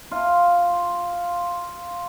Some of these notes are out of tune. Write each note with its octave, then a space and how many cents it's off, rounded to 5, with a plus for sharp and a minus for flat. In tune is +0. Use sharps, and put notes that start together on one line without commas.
F4 +0